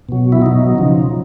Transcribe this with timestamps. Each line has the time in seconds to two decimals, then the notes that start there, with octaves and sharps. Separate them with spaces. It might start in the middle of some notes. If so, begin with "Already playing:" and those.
0.09 B2 F#3
0.32 E4
0.42 B2 F#3 D#4
0.75 C#3 F3